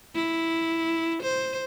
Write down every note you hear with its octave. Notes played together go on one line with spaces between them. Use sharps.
E4
C5